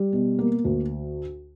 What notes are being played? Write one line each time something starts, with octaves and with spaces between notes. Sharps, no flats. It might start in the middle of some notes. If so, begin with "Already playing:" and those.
Already playing: G3
B2
A#3
D2